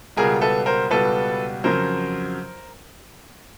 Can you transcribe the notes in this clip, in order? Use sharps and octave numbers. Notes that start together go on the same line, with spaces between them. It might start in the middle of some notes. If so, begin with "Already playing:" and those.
C#2 B2 G3 G#4 A#4
A4 B4
A#4 C5
C#2 B2 G3 A4 B4
F2 C#3 F#3 A#4 C5